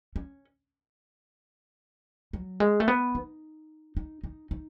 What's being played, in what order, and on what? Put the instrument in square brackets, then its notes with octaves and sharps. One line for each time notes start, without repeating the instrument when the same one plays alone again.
[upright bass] C#4
F#3
G#3
A3
B3
D#4
D#4
D#4
D#4